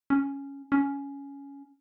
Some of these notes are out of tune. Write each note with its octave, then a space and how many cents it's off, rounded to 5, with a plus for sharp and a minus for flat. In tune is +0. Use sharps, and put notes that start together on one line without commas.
C#4 +0
C#4 +10